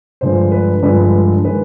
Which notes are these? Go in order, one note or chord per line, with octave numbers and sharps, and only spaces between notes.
G2 D3 F3 G#3 C5
B4
G2 D3 F3 G#3 B4
D#3 G#3 B4